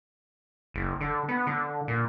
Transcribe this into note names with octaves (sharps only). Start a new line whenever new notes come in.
F#1
D3
B3
D3
A#2